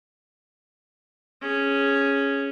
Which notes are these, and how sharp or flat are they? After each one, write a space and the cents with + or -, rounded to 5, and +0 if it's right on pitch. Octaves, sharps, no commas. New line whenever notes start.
C#4 +0 G#4 +0